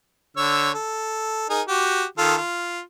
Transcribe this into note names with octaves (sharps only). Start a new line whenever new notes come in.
D3 C#5 E6
A4
D#4 G#4 A#4
F#4 G4
D#3 F4 A4
F4